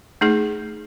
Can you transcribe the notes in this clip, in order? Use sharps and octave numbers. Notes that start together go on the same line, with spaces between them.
A3 D#4 G#4